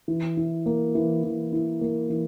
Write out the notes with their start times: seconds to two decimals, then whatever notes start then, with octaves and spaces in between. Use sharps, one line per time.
0.08 E3
0.37 E4
0.66 A#3
0.95 E3
1.24 E3
1.52 E4
1.81 A#3
2.10 E3